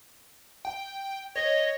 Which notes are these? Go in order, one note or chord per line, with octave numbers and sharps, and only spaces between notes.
G5
C#5 D#5